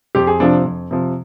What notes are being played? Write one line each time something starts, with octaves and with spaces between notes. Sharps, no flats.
F2 G4
G#4
C3 F3 D4
F2
C3 F3